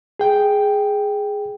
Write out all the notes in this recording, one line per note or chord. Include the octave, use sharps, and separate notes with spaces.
G#4 G5